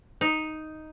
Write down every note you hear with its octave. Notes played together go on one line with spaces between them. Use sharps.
D#4